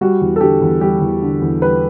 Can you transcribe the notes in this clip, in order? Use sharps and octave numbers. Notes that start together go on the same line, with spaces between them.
G3 F#4
E2
A4
D3 G4
E2
G3 G4
E2
D3
E2
G3 B4